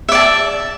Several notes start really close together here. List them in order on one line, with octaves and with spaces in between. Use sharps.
E5 D5 A5